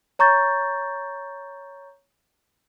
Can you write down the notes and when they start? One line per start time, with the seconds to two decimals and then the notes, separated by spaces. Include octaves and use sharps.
0.19 C#5 A#5 C#6 G6 A6